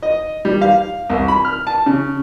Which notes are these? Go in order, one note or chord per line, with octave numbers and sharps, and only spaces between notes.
D#5
G3
F5
C2
B5
F6
A5
C#3